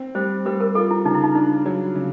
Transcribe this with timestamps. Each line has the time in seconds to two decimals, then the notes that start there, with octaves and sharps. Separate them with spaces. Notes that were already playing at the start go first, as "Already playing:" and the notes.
Already playing: C4
0.15 G3 C5
0.46 G3 B4
0.61 A#4
0.75 F4 A4
0.91 E4
1.05 C#3 D#4
1.15 E4
1.24 D#4
1.35 D4 D#4
1.66 F#3
1.95 C#3